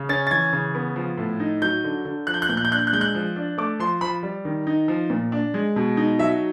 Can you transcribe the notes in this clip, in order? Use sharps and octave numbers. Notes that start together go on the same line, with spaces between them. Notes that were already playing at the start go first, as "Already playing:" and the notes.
Already playing: C#3
C#4 A6
A6
E3 G#6
C#3
B3
F3
A2
D#4
F#3 G6
D3
D3
F3 F#6
G6
F#6
A#2 G6
F#6
G6
D4 F#6
G6
F#6
G#3 G6
F#6
F3
D4
A3 D6
F3 C6
F3 B5
G3
D#3
D#4
F3
A#2
D4
G#3
B2
D#4
F#3 E5